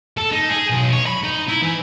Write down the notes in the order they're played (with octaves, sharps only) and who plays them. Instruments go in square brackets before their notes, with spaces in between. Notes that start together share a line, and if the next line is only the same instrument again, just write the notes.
[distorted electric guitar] A4
D#4
G#4
B1
C#5
B5
D#4
E4
E3